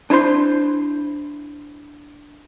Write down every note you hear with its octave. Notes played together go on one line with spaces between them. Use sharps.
D4 E4 C5 C6